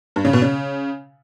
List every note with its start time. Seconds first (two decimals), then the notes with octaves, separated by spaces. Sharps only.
0.16 G2
0.25 C#3
0.33 B2
0.42 C#3